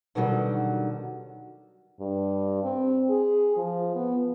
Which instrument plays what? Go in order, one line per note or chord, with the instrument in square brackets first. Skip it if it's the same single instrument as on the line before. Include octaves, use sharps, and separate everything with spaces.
[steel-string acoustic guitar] B2 D3 D#3 F#3 G3 F#4
[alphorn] G2
C4
G#4
F3
B3